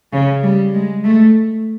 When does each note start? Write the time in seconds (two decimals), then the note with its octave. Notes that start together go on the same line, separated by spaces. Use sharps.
0.13 C#3
0.43 G3
0.73 G#3
1.04 A3